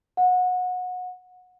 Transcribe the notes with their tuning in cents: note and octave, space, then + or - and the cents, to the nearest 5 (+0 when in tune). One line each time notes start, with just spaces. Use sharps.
F#5 -25